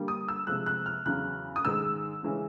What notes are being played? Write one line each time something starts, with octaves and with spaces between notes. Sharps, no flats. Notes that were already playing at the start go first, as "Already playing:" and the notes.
Already playing: D3 G3 A#3
D#6
E6
C3 F3 G#3 F#6
F#6
F6
E2 C#3 F#3 F#6
D#6
G#2 D#3 G#3 E6
C#3 E3 G#3 C#4